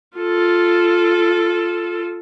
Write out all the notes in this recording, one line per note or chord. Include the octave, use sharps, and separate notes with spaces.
F4 A4